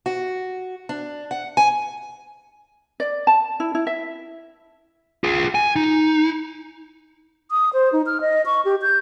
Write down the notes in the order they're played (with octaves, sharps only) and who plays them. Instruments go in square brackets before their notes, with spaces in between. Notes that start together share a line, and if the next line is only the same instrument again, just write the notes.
[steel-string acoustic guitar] F#4
D4
F#5
G#5
[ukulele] D5
A5
E4
E4
E5
[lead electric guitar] F4 G#4
G#5
D#4
[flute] D#6
C5
D#4
F6
D#5
C#6
G4
G6